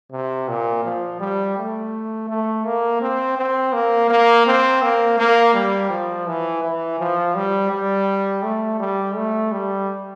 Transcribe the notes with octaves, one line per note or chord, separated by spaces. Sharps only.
C3
A#2
F3
G3
A3
A3
A#3
C4
C4
A#3
A#3
C4
A#3
A#3
G3
F3
E3
E3
F3
G3
G3
A3
G3
A3
G3